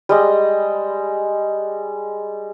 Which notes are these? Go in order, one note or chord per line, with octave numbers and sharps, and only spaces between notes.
G3 G#3 D#5